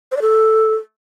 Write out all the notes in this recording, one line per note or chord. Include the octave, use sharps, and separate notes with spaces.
C5
D5
A4